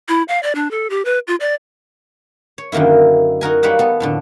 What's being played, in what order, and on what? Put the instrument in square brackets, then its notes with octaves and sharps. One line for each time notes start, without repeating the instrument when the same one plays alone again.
[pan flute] E4
F5
D5
D4
A4
G4
B4
F4
D5
[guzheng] C#5
F#2 D3 D#3 A#3 E4
D#4 F#4 A#4 G#5
G3 A#3 D#4 B4 C#5 F#5
B3 A4
F2 A2 D3